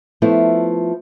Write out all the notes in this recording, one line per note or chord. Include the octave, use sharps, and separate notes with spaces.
F3 A3 B3 E4